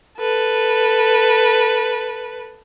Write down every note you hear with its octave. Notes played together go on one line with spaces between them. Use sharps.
A4 B4